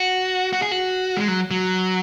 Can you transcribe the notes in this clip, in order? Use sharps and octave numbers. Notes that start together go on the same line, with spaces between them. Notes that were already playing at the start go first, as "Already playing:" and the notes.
Already playing: F#4
F#4
G#4
F#4
G#3
F#3
F#3